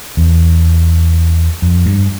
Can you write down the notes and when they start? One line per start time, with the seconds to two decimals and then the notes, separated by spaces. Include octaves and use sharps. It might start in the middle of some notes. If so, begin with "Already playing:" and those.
0.17 E2
1.62 F2
1.86 G2